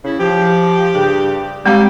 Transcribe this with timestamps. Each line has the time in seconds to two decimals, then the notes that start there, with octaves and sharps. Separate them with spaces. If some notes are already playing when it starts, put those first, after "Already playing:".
0.04 C#3 E4
0.20 F3 G4
0.95 G2 C#3 G#4
1.66 G3 G#3 C4 F5 G5